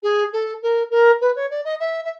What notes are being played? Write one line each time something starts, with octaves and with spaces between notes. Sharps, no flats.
G#4
A4
A#4
A#4
B4
C#5
D5
D#5
E5
E5